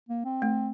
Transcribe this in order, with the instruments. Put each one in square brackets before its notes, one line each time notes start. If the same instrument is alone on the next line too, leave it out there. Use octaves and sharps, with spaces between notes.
[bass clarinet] A#3
C4
[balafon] A3